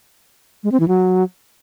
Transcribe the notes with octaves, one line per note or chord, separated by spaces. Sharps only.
G#3
C4
E3
F#3